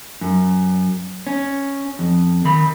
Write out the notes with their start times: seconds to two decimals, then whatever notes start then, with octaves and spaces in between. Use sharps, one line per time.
0.21 F#2
1.27 C#4
1.99 F2
2.45 D#3 B5